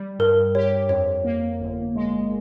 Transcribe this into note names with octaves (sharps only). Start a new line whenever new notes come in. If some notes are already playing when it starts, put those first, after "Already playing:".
Already playing: G3
G2 A#4
G4 C#5
F2 C#5
A#3
G1
G#3